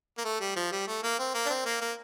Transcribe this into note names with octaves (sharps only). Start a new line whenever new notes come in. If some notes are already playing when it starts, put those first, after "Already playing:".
A#3
A3
G3
F3
G3
A3
A#3
C4
A#3
D4
C4
A#3
A#3